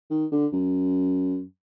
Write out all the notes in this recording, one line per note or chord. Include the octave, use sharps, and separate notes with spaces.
D#3
D3
F#2